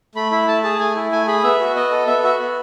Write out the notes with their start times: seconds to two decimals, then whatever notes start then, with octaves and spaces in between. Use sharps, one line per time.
0.15 A3 B5
0.31 E4 B5
0.48 A3 A5
0.63 G#4 A5
0.80 A3 G#5
0.95 E4
1.12 A3 G#5
1.27 G#4 B5
1.43 B3 E5
1.60 F#4
1.75 B3 D#5
1.91 A4
2.07 B3 E5
2.23 F#4 E5
2.39 B3